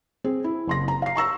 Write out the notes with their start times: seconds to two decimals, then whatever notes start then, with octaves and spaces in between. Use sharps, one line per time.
0.24 C4 G#4
0.44 E4
0.67 F#1 C6 A#6
0.88 A#5
1.02 F5 C7
1.16 A#5 C#6 E6 A#6